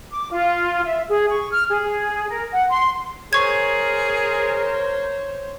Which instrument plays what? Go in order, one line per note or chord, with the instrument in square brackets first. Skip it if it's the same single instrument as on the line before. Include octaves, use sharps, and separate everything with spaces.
[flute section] D6
F4
E5
G#4
C#6
F6
G#4
A#4
F#5
C6
[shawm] G#4 [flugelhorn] A#4 [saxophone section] C5 C#5 [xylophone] C#6 G#6